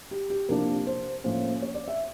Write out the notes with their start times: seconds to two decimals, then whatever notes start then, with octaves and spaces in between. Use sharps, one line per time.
0.11 G4
0.30 G4
0.49 C3 F3 A#3 D4 A#4
0.87 C5
1.24 A2 F3 A#3 C#4 C5
1.62 C#5
1.75 D5
1.88 E5